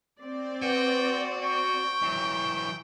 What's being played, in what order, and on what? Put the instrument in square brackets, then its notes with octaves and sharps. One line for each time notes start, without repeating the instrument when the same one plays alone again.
[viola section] C4 D5
[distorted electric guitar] F#4 [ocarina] B4 [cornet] G5
[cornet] G5 [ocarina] C#6
[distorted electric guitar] E3 F#3